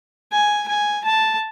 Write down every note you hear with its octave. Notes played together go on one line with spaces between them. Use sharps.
G#5
G#5
A5